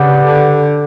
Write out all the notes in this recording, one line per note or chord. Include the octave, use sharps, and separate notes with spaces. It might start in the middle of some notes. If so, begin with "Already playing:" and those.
Already playing: C#3 D4 G4 B4 D5 F#5
D3